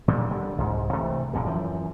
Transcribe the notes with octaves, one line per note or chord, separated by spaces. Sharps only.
A#2 D3 G3 G#3
D3 G3
C2 G#2
C3 E3 A3
D1 F2 A#2 D3
F#2 E3 F3